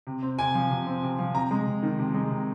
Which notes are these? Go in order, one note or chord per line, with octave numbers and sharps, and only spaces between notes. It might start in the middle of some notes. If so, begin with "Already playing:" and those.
C3
C4
C3 G#5
F3
C3
C4
C3
F3
C3 A#5
G#3
C3
D#3
C3
G#3
C3